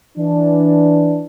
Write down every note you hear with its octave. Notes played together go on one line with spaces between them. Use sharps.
E3 D4